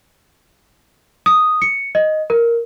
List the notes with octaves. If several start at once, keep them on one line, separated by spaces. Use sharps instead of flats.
D#6
C#7
D#5
A#4